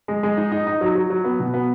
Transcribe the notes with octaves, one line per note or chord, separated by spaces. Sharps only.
G#3
G#3
D#4
D#4
D#4
F#3
F#3
F#3
B3
B2
B3